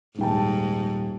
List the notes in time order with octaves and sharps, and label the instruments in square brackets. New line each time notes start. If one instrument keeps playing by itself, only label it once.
[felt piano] D#1 G5 A5 [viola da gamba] G#2